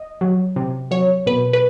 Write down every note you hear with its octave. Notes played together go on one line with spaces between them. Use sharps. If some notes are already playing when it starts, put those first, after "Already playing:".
Already playing: D#5
F#3
C3
F#3 C#5
B2 B4
B4